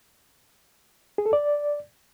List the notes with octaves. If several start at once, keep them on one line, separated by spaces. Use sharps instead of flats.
G#4
A4
D5